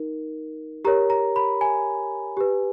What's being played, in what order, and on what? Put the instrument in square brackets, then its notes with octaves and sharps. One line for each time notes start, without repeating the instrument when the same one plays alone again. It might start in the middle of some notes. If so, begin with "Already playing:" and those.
Already playing: [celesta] D#4 A#4
G4 A#4 C#5 A#5
A#5
B5
G#5
G4 B4